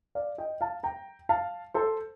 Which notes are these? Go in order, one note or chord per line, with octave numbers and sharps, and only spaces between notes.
D5 F5
D#5 G5
F5 A5
G5 A#5
F5 A5
A4 C5